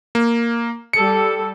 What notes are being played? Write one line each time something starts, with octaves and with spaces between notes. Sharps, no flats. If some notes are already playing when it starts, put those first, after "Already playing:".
A#3
G3 A4 C#7